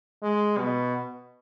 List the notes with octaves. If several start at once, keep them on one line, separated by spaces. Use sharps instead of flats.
G#3
B2